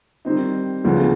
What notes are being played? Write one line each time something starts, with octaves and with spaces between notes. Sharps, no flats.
D#3 G3 C4 D#4
D2 C#3 F3 G#3 B3